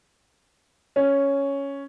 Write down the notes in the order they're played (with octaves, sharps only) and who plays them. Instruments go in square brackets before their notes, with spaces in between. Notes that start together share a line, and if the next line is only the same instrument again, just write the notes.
[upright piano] C#4